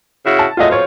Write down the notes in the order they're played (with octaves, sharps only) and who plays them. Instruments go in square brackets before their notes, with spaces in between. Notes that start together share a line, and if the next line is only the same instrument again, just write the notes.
[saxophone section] C#3 E4 F#4
[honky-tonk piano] A5
[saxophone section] F#3 G#3 A3 [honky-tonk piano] F4 D#5
[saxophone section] F2 B2 F4 [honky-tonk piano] C5 C#5